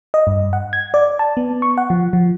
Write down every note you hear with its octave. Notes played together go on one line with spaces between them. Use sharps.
D#5
G2
F#5
G#6
D5
A5
B3
C#6
F#5
F3
F3